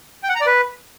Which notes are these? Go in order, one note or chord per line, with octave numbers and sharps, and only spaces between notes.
G5
F#5
A#5
D5
B4